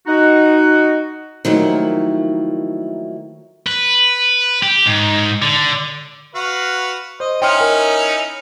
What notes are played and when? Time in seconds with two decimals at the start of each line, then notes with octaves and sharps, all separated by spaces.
0.07 D#4 F#4
1.45 D#3 F3 F#3 A3 A#3 E4
3.66 B4
4.62 G4
4.86 G#2
5.42 D3
6.35 F#4 B4 F5
7.20 C5 D#5
7.42 C#4 D#4 E4 G5 C6 F6
7.61 A#4